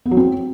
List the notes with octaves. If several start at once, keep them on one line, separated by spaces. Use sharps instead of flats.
B3
F#3
C4